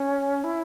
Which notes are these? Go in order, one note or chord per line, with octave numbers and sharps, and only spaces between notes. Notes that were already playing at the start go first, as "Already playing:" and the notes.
Already playing: C#4
E4